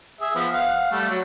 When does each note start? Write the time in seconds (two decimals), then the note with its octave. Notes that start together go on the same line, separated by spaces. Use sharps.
0.21 G#4 E5
0.35 F3 B3
0.54 F5 F#5
0.92 G3 A3
1.09 F#3